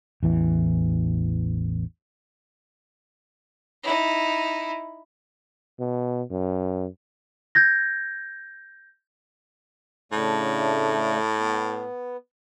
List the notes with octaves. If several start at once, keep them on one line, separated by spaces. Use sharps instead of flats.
A1 E2 E3
D#4 E4
B2
F#2
G6 G#6 A#6
A2 C#3 A3 D4
B3